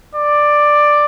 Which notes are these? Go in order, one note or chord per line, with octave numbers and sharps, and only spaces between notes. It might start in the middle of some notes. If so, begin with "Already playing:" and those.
D5